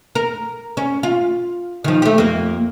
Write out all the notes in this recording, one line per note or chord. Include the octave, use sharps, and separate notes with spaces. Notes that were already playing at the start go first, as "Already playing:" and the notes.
A#4
C#4
F4
D#3 F3
A3 G4
F2 A#3